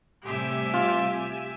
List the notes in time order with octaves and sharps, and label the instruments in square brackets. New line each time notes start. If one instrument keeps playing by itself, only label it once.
[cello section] A2 C3 G3 [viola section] G4 E5 G#5
[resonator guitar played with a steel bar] F4